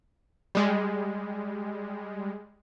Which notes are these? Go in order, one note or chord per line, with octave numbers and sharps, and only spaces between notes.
G3 G#3